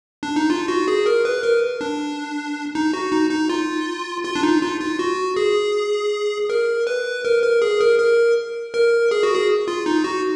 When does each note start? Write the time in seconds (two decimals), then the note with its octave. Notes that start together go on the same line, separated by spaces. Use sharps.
0.23 D4
0.36 D#4
0.50 F4
0.68 F#4
0.88 G#4
1.06 A#4
1.25 B4
1.43 A#4
1.81 D4
2.75 D#4
2.93 F#4
3.12 D#4
3.31 D#4
3.49 F4
4.25 F4
4.36 D4
4.43 D#4
4.62 F4
4.80 F4
4.99 F#4
5.37 G#4
6.50 A#4
6.87 B4
7.25 A#4
7.43 A#4
7.62 G#4
7.81 A#4
7.99 A#4
8.74 A#4
9.11 G#4
9.23 F#4
9.34 G#4
9.68 F4
9.86 D#4
10.04 F#4